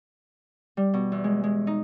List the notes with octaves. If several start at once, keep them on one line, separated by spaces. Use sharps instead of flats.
G3
B2
E2
G#3
G#3
D#4